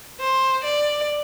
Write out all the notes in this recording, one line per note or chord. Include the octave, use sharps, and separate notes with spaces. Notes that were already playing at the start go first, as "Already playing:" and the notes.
C5
D5